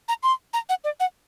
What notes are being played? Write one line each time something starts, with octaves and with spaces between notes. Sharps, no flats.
A#5
C6
A#5
F#5
D5
F#5